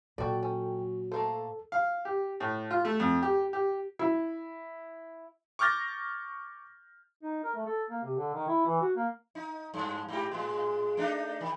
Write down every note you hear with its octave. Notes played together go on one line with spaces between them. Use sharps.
A#2 F#3 F#4 A4 D5 G5
C#4
A3 A#3 A4 C5
F5
G4
A2
F4
A3
F2
G4
G4
E4
C#6 D6 F6 G6 A6 A#6
D#4
A#4
A3
A4
A#3
C3
D3
D#3
E4
E3
F#4
A#3
D#4
G2
G#2 G4
A2 G#3
A3 D4 D#4
D#3